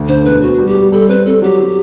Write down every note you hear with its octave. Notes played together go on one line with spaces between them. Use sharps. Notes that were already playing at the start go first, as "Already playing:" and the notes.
Already playing: D2
D3 C5
E1 B4
B3 F#4
G3
G4
G3
G3 A4
C4 B4
C4 A4
F#3 G4
F#3